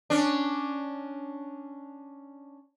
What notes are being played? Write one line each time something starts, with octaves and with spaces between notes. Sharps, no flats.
C#4 D4